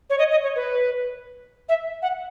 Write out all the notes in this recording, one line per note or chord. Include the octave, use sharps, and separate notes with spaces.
C#5
D#5
D#5
C#5
B4
E5
F#5